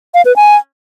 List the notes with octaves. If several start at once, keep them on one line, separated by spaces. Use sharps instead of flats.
F5
B4
G#5